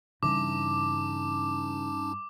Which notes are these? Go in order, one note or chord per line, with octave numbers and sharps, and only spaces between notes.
G2 C#3 E3 C#4 D#4 A5 D6